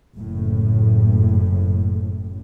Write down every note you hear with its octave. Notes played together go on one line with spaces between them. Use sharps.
F#1 A2